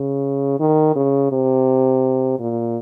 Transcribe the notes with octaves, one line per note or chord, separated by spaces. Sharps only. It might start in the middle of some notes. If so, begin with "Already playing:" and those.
Already playing: C#3
D#3
C#3
C3
A#2